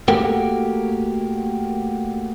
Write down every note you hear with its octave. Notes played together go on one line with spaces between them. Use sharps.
A3 A#3 F#4 G4 A4 A#4